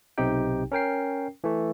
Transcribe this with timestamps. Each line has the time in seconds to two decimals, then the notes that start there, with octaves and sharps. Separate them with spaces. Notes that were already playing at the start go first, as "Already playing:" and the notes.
0.18 B1 C3 C4 D#4 G4 G5
0.72 C#4 A#4 G5 C7
1.44 E3 A3